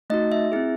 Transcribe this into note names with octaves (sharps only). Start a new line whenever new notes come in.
A3 D#4 F#4 D#5
E5
C4 E4 G#4